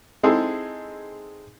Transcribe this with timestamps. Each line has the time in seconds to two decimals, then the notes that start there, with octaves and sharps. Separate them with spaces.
0.23 G#3 C4 D#4 E4 G#4 A4